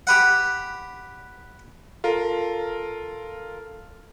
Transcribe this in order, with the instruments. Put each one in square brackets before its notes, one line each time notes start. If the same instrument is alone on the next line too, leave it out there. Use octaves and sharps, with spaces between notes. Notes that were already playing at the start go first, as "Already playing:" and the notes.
[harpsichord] G4 B4 F#5
[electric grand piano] F4 A#4 [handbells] A4